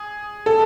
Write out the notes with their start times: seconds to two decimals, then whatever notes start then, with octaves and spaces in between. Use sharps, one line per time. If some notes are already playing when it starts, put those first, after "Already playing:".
Already playing: G#4
0.46 A4